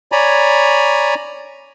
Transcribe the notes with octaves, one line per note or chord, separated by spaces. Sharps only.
C#5 D5 G#5 A#5 B5